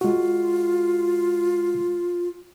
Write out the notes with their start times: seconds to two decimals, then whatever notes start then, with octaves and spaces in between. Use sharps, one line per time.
0.01 G#3 F4 F#4